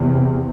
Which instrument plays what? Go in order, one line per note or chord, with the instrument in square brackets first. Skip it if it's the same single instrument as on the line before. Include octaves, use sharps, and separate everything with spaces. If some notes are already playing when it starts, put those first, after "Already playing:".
Already playing: [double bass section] E2 C3